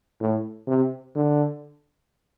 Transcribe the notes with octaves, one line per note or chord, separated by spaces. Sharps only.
A2
C3
D3